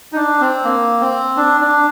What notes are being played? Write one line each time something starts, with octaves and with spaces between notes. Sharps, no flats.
D#4
D4
C4
A#3
C4
D4
D4